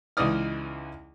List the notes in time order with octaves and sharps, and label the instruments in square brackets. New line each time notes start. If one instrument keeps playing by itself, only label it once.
[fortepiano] C#2 E3 D#4 D5 D#6 F6